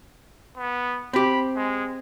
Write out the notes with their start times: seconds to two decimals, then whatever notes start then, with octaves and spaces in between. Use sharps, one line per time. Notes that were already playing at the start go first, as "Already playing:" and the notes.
0.58 B3
1.13 C4 G4 B5
1.56 G#3